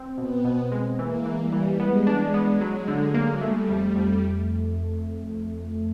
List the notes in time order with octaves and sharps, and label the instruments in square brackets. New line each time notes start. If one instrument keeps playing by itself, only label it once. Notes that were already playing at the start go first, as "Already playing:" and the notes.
Already playing: [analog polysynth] C4
[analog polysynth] B2 [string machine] B3
[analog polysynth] B2
G#3
[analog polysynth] E3 [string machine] A#3
[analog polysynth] E3
[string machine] G3
[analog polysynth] E3
[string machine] G#3 [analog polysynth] B3
[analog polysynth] D4
B3
[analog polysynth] F#3 [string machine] G#3
[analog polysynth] D3
A#3
[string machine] G3 [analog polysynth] A3
[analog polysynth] F2
F2